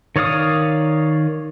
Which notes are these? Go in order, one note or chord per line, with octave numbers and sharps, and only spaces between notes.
D#3 C#5 D5 F5 D#6